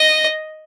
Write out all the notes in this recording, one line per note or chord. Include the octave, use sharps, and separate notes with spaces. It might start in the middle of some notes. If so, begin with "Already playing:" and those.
Already playing: D#5